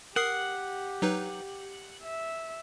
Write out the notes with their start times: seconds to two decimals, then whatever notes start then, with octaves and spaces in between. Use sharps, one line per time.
0.16 G4 A#4 F#5 D#6 C7
1.02 F#3 D#4 B4
2.02 E5